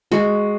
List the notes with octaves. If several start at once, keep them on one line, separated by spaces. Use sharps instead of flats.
G#3 F#4